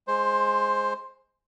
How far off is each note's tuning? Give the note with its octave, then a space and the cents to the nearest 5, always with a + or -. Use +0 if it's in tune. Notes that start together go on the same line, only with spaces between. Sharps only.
G#3 +0 C5 +10